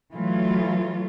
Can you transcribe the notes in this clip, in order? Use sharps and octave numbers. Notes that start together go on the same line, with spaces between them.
E3 F#3 A3 F4